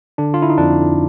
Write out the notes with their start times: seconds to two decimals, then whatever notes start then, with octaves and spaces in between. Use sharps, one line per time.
0.18 D3 D4
0.34 F4
0.42 E4
0.50 D#4
0.58 F2 D4